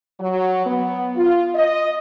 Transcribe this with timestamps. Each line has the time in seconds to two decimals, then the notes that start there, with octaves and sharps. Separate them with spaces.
0.19 F#3
0.66 B3
1.16 F4
1.55 D#5